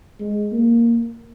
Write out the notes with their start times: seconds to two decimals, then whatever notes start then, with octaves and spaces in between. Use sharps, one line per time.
0.20 G#3
0.52 A#3